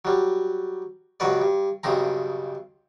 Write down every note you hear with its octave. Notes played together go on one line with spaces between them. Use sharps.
F#3 G3
C#2 G2 F#3 F#4 B4 D5
G2
B1 G2 C#3 C4 A#5